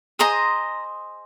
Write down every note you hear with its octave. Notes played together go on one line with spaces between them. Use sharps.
G#4 C5 D#5 A#5 C6